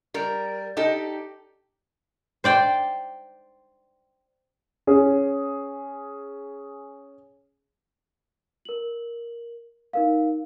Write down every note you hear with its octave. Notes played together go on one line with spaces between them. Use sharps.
G3 A#4
D#4 G4 A4
C5 D5 G5
C#4 G#4
A#4 F#7
D#4 A#4 F5